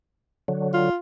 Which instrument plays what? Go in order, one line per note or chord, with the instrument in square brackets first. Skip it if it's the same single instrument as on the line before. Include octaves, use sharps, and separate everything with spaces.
[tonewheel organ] D3 F#3
[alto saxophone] F4